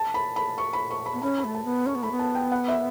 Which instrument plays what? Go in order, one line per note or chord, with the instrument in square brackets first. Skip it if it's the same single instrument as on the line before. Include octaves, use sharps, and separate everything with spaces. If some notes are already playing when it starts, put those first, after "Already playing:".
Already playing: [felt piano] A5
B5
B5
C#6
B5
C#6
B5
[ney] B3
[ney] C#4 [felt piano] B5
[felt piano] B5
[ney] A3
[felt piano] A5
[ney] B3
[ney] C#4 [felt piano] C#6
[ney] B3
[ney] A3 [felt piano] B5
[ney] B3
[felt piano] A5
G5
F#5
E5